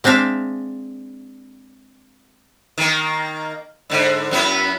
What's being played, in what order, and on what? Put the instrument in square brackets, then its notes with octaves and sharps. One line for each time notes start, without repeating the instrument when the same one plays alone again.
[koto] G#3 C4 D4 E5 F5
[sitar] D#3 A#3
G#2 D3
F#2 B3 E4